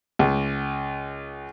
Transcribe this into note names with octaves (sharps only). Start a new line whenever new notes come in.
C#2